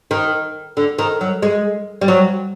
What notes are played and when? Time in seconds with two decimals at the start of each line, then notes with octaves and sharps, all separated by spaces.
0.11 D#3
0.77 D3
0.99 D#3
1.21 F#3
1.42 G#3
2.01 G3
2.08 F#3